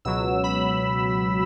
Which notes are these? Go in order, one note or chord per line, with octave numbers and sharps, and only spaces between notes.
C#2 B2 F#3 E6
B5